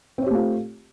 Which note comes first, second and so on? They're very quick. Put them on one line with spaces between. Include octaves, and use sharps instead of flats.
C4 C#5 G4 A3 F4